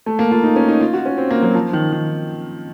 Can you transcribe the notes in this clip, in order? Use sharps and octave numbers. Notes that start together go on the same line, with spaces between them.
A3
A#3
F4
D#4
C#4
D#4
F4
F#4
C#4
C4
A#3
F#3
F3
D#3
D#3